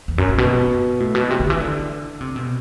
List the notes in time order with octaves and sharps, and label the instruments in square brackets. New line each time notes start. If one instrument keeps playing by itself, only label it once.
[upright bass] E2
F#2
G2
B2
A2
B2
C3
D3
E3
D3
C3
B2